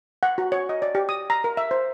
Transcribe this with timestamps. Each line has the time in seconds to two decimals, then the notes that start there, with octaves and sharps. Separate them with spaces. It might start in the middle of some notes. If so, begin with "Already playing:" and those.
0.23 F#5
0.38 F#4
0.52 C#5
0.69 D#5
0.82 D5
0.95 G4
1.09 D#6
1.30 A#5
1.44 A#4
1.57 E5
1.71 C5